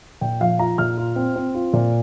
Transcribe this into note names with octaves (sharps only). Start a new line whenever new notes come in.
A#2 G5
F3 F5
F4 A#5
A#2 F6
F4
C4
C4
F4
A#2